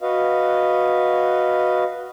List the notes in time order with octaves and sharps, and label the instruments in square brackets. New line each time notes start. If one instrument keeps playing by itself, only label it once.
[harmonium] F#4 B4 D#5 F5